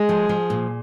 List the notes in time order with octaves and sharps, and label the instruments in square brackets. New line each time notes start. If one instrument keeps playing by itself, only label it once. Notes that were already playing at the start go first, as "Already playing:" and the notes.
Already playing: [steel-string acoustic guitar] G#3 [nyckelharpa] G#4
[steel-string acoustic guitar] F3
F3
A#2